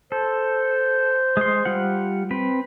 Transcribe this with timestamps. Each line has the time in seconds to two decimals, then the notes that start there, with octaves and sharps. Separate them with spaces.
0.12 A4 C5
1.37 G#3 C6
1.65 G3 F4 F#5
2.31 C4 B4